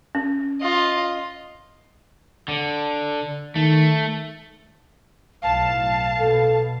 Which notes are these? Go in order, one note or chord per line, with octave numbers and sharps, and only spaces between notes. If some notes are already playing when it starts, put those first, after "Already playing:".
C#4
F4 D#5
D3
D#3 A3
B1 A2 F5 A5
B2 A4